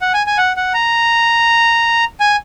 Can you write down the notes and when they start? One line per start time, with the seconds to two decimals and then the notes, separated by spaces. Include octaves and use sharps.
0.01 F#5
0.14 G#5
0.27 G#5
0.38 F#5
0.57 F#5
0.74 A#5
2.20 G#5